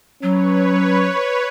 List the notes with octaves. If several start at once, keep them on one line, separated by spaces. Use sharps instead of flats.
F#3 C#4 B4 C#5